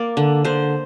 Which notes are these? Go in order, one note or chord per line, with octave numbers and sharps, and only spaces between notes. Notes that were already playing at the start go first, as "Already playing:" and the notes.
Already playing: A#3 D5
D3
D3 C5